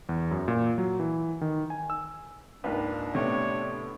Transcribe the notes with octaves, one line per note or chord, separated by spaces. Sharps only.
E2
F#2
A#2
F#3
E3
D#3
G#5
E6
C#2 G#2 A#3 D4 F4 B4
A2 C3 B3 C#5